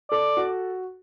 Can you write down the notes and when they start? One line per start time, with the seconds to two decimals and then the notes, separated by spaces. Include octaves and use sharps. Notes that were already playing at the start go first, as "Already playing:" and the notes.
0.11 A4 D5
0.37 F#4